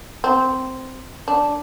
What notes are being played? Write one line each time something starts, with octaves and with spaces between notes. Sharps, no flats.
C4
D4